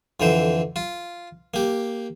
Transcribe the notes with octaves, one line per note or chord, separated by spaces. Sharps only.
F2 D3 E3 C5
F4
A#3 G4